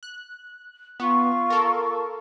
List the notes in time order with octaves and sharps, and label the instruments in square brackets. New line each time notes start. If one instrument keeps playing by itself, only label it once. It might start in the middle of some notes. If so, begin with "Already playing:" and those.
[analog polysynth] F#6
[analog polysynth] B3 [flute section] F4 C#6
[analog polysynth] A4 A#4